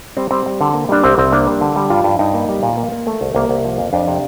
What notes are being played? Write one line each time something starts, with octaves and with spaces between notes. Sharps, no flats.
G3 C4
G3 C4
G3
D3
A#3
G3 D4
C2 C4
C2 C4
A#3 D4
G3
D3
G3
G2 F4
G2
G2 D#4
A#3
G3
A#2
A#3
A#3
A3
C2
C2 A#3
C2
F3
F2
F2 D4
C3